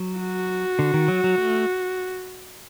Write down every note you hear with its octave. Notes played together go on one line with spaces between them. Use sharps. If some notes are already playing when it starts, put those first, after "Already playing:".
Already playing: F#3
F#4
D3
D#3
F#3
F#3
A3